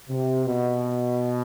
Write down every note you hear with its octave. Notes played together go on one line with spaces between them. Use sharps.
C3
B2